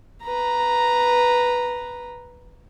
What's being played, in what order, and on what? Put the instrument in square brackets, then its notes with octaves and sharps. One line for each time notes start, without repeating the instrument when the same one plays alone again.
[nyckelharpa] B4 A#5